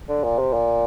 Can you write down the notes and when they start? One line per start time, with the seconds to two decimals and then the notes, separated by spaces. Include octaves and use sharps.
0.09 D3
0.24 A#2
0.39 C3
0.54 A#2